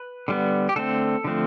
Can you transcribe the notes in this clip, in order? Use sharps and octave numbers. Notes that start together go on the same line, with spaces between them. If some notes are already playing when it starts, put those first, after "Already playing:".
Already playing: B4
D3 G3 B3
G4
D3 A3 C4 A4
D3 F3 A3 C4